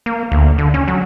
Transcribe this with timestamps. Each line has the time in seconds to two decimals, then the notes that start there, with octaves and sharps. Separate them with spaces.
0.06 A#3
0.32 D2
0.58 D3
0.74 C#4
0.88 F#3